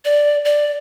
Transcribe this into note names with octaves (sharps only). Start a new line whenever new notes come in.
D5
D5